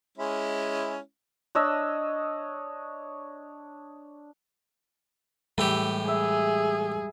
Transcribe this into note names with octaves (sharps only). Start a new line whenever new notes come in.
G#3 C#4 E4
D4 C#5 D#5 E6
A2 E3 G3 G#3 G4 B5
G#4 E5